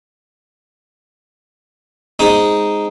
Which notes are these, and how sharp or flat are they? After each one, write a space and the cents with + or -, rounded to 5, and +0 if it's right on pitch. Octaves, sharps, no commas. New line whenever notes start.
G#3 -5 C4 +0 D#4 +0